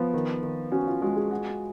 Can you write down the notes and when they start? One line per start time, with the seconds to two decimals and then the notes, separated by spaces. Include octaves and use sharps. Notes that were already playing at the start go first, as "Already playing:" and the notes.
Already playing: F3 B3
0.14 D#3
0.43 D#3
0.72 C#4 F#4
0.87 F4
1.02 G#3 F#4
1.16 G#4
1.31 F#4